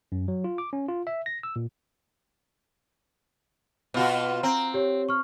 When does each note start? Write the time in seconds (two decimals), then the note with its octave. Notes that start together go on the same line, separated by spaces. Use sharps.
0.12 F#2
0.28 F#3
0.44 F4
0.58 D6
0.73 C#4
0.88 F4
1.07 E5
1.26 A#6
1.43 E6
1.56 A#2
3.94 B2 F4 F#4
4.43 C4 A#5
4.74 G4 C#5
5.09 C#6 F6